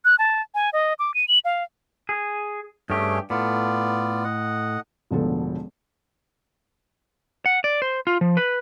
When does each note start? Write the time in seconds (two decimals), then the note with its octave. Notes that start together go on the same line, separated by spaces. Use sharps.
0.05 F#6
0.19 A5
0.55 G#5
0.73 D#5
0.99 D6
1.14 D#7
1.28 F#7
1.45 F5
2.09 G#4
2.90 G2 A3 C#4 G4 G#4
3.30 A2 B3 F4 D5
4.24 D#5 F#5
5.11 E1 A1 D3 F3 B3 A4
7.46 F#5
7.64 D5
7.82 C5
8.07 F4
8.21 F3
8.37 B4